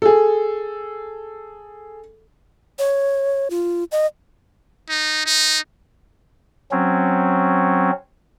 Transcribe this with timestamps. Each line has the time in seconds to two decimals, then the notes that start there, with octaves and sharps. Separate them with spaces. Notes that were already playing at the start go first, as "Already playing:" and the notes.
0.02 G#4 A4
2.79 C#5
3.50 F4
3.92 D#5
4.89 D#4
5.26 D#4
6.71 F#3 C4 C#4